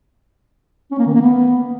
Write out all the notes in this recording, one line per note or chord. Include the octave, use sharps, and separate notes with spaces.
C#4
A#3
D#3
A#3
B3